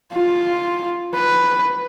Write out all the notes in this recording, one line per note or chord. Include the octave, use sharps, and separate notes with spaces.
F4
B4